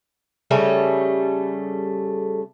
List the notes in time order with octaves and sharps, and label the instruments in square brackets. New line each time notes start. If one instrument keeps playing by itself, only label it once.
[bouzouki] C#3 G3 A3 A4